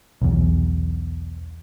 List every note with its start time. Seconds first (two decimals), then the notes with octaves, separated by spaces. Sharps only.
0.22 B1 E2